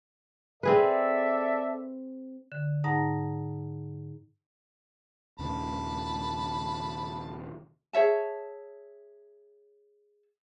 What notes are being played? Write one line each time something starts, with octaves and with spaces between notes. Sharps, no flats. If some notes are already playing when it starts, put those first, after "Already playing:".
C4 G#4 A4 B4 D5 E5
D3
G#2 D#4 F#5 A5 A#5 A#6
D#1 D#2 C#3 A5 B5
G#4 C#5 E5 A5